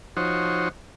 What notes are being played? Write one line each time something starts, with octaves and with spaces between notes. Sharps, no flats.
F3 D#4 F#4 C5 C#5